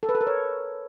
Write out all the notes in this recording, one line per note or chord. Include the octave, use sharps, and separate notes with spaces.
A4
B4
A4
A#4
C#5